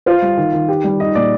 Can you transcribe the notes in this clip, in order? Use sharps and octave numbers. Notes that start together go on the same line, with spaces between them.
F4 C5
G3
D#3
D#3
G4
G3
D#4 D#5
A#2 D5